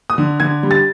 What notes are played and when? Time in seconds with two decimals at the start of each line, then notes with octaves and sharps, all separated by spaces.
0.10 D#6
0.18 D3
0.40 D3 G#6
0.63 G3
0.71 A6